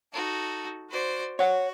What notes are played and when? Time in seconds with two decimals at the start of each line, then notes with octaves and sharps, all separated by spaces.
0.12 D#4 F#4 A4
0.89 F#4 C5 D5
1.39 F#4 C#5 F#5